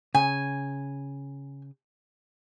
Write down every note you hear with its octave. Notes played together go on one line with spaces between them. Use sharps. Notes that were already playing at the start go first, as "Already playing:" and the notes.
C#3 G#5